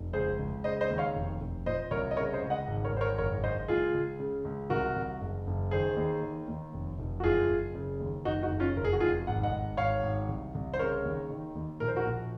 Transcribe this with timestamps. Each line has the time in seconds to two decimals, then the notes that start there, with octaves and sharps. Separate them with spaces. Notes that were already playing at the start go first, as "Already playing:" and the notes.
Already playing: F1
0.13 C#2 G#4 C5
0.40 C#2
0.64 C#3 C5 D#5
0.81 C5 D#5
0.90 D#2
0.98 C#5 F5
1.15 F1
1.40 F1
1.66 A#2 C5 D#5
1.91 C2 A#4 C#5
2.11 D#5
2.16 C#3 A#4 C#5
2.34 C5 D#5
2.42 C#2
2.50 D#5 F#5
2.67 G#1
2.85 A#4 C#5
2.92 G#1 C5
3.01 A#4 C#5
3.18 F#1 A#4 C#5
3.44 F#1 C5 D#5
3.68 C#2 F4 G#4
3.94 C#2
4.20 C#3
4.45 C#2
4.70 C2 F#4 A#4
4.96 C2
5.21 F#1
5.47 F#1
5.71 D#3 G#4 C5
5.97 D#2
6.23 D#3
6.48 D#2
6.74 F1
6.99 F1
7.20 F#4
7.24 F#1 F4 G#4
7.50 F#1
7.75 C#3
8.00 D#2
8.25 F#1 D#4 F#4
8.43 D#4 F#4
8.51 F#1
8.60 C#4 F4
8.76 F1 A#4
8.85 G#4
8.93 F#4
9.00 F1 F4 G#4
9.27 G#1 F#5
9.43 D#5 F#5
9.52 G#1
9.77 G#1 C#5 F5
10.03 G#1
10.28 C2
10.55 C2
10.74 C5
10.79 C#3 A#4 C#5
11.04 D#2
11.31 D#3
11.55 D#2
11.80 A#1 A#4
11.88 C5
11.96 F#4 A#4
12.06 A#1